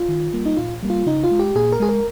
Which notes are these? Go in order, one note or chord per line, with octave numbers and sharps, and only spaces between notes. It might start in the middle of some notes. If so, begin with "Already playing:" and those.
Already playing: F4
D#3
G3 A#3
D#4
A#2 F4
G3 A#3
F4
C#3 D#4
F4
G#3
G4
A#2 G#4
A#4
G#3 G#4
A#4